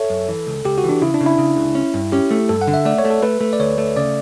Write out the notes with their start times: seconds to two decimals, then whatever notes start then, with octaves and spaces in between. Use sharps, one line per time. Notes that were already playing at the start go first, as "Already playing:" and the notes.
Already playing: A4 C#5 E5
0.10 F#2
0.28 E3
0.47 C#2
0.65 C#2 G4
0.78 F#4
0.84 E3
0.89 D4
1.01 C#3 E4
1.14 D4
1.21 C#3
1.26 E4
1.38 C#3
1.57 C#2
1.75 C#4
1.94 G2
2.12 C#4 G4
2.31 A3
2.49 G2 A4
2.62 F#5
2.67 D3
2.74 E5
2.85 A3 D5
2.99 C#5
3.05 A3
3.10 A4
3.23 A3 B4
3.40 A3
3.53 D5
3.60 D2 C#5
3.78 A3
3.96 C#3 D5